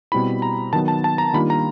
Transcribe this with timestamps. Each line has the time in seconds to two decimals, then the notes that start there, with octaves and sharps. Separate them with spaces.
0.12 B2 G3 C4 E4 B5
0.42 A#5
0.73 D#3 F#3 B3 D#4 A5
0.88 A5
1.04 A5
1.18 A#5
1.34 D#3 G3 A#3 D4 F4 B5
1.50 A#5